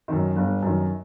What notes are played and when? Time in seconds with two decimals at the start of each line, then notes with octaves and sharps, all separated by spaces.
0.08 F#2 D#3
0.36 G1
0.62 F#2 D#3